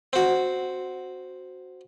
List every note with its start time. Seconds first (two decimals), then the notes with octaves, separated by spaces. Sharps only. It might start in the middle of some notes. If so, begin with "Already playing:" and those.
0.13 C4 F#4